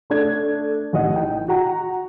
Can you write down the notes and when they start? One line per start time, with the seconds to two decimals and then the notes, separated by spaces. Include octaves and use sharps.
0.10 A3 D4 G#6
0.93 A1 D#3 D#5 F#5
1.16 G5
1.48 F#4 F#5 A#5